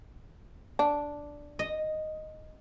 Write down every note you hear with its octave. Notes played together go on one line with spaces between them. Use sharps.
D4
D#5